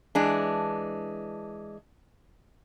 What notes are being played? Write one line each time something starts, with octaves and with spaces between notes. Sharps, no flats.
E3 G#3 D4